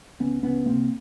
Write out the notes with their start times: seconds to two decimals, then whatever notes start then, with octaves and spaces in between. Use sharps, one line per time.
0.20 C#2 B3 C#4
0.43 C#2 B3 C#4
0.66 C3 A#3 C4